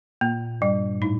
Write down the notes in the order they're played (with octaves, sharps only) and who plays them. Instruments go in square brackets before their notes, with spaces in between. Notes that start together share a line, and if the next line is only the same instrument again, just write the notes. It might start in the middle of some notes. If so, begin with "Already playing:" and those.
[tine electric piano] A#2 [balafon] A#3
[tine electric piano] G2 [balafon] G3
[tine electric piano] A2 [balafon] D#4